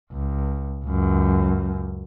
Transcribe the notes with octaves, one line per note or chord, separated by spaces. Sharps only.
C#2
C#2 F#2